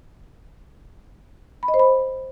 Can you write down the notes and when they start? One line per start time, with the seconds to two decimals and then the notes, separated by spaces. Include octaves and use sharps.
1.63 B5
1.68 D#5
1.74 C5
1.79 B5